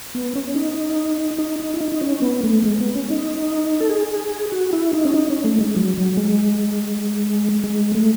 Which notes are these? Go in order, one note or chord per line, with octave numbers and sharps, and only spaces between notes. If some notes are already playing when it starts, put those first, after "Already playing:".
B3
C#4
D#4
D#4
D#4
E4
D#4
D#4
C#4
B3
A3
G#3
B3
C#4
D#4
A4
G#4
F#4
E4
D#4
C#4
D#4
C#4
A3
G#3
F#3
F#3
G#3
G#3
A3